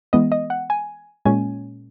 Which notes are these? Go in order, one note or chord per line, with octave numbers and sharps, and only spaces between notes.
E3 G#3 B3 D#5
D#5
F#5
G#5
A#2 G#3 C#4 G#5